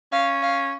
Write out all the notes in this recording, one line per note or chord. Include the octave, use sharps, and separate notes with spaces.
C#4 F5
F5